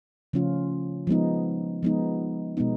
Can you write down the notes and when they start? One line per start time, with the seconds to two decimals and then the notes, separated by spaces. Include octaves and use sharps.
0.33 C#3 F3 A3 C#4 F4
1.07 F3 G#3 B3 D#4
1.83 F3 G#3 B3 D#4
2.57 B2 G#3 B3 D#4